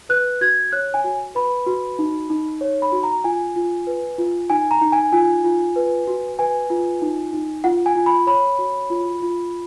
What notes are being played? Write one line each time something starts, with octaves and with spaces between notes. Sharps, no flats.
B4 F#6
F#4 G#6
C#5 F#6
G#5
F#4
B4 B5
F#4
D#4
D#4
C#5
B5
F#4
A#5
F4 G#5
F4
B4
F4
D#4 G#5
A#5
D#4
G#5
F4 G#5
F4
B4
F#4
B4 G#5
F4
D#4
D#4
F4 F#5
G#5
F4
B5
C#5 B5
F#4
F4
F4